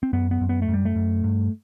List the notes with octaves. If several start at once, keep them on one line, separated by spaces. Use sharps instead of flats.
C4
F#2 B3
B3
F#2
B3
A3
F#2
G3
A3
F#2
G2